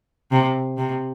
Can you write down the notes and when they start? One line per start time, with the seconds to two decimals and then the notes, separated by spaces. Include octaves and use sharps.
0.32 C3
0.78 C3